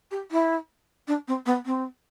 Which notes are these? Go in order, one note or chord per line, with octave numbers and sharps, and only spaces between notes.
G4
E4
D4
C4
B3
C4